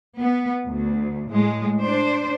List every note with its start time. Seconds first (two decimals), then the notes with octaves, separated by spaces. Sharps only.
0.19 B3
0.67 D2
1.30 A2 G#3
1.82 D4 C5